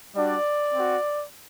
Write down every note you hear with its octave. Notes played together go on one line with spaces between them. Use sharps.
G3 D4 F#4 D5
C4 F#4